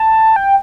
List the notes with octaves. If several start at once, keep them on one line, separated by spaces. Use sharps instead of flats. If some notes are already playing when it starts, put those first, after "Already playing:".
Already playing: A5
G5